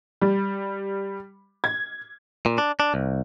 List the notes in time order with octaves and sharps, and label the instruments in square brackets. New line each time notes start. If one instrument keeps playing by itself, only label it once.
[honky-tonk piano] G3
G#6
[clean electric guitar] A#2
D4
D4
C2